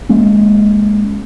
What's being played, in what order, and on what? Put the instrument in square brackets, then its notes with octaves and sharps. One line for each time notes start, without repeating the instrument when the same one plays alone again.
[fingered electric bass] G#3 A#3 C#4